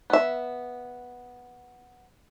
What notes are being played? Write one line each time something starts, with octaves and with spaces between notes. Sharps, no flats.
B3 E5